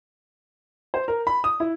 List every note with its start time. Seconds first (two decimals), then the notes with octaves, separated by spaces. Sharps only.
0.94 C5
1.08 A#4
1.27 B5
1.44 D#6
1.60 E4